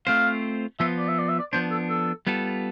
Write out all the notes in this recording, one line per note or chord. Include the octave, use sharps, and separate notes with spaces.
A3 C4 F4 C5 F5
F3 B3 F4 E5
D5
E5
D5
E5
D5
F3 B3 D4 C5
A4
A4
G3 B3 F4 A4